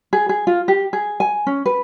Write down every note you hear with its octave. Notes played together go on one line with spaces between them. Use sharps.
G#4
G#4
F4
G4
G#4
G#5
C#4
B4